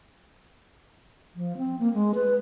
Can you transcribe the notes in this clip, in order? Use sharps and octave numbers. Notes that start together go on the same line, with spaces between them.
F3
C4
A#3
G#3
B4